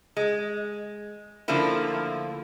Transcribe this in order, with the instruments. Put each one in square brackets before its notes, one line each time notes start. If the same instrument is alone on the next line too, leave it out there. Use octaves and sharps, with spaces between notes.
[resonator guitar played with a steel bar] G#3
D3 F3 A3 A#3 E4